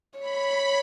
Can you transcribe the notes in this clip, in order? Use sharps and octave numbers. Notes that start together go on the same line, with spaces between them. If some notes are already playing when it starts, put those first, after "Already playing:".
C#5 B5